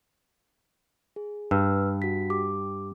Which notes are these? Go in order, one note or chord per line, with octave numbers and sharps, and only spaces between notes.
G#4
G2 B4 E6 F6
F#4 B6
G4 D6